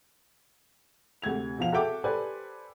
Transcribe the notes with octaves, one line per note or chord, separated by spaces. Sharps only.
D2 C3 G#6 F7
B2 F3 F5 F7
F#4 A4 E5 G5 D6
G4 A4 B4 C5 D5 G#5